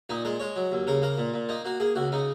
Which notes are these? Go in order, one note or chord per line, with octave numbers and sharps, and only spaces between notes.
A#2 D#4
G#3 A#4
G#3 C#5
F#3
D#2
C#3 A#4
A#3 A#4
A#2
A#2
A#3 D#4
A#3 F#4
A#3 G#4
C#2 F#4
C#3 D#4